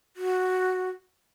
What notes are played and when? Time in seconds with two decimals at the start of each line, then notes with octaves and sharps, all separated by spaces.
0.16 F#4